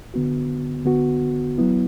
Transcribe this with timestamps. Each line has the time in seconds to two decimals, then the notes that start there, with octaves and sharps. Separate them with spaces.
0.14 D3 B3 F#4
0.85 D3 B3 F#4
1.58 F#3 B3 E4